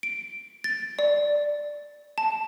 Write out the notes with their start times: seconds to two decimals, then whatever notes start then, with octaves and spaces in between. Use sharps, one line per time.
0.03 D7
0.64 A6
0.99 D5
2.18 A5